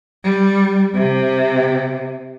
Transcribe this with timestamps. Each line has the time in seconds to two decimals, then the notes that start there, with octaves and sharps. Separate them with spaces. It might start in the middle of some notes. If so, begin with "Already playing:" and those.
0.24 G3
0.95 C3